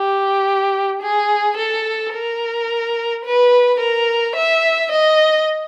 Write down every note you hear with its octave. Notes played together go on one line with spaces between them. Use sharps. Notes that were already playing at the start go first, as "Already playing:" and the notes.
Already playing: G4
G#4
A4
A#4
B4
A#4
E5
D#5